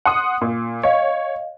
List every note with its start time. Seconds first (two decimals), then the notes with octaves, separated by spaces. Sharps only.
0.05 F#5 C6 D#6
0.41 A#2
0.83 C#5 D#5 F5